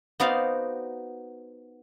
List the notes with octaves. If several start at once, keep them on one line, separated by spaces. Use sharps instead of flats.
B3 D#4 F#4 C5 D5 F5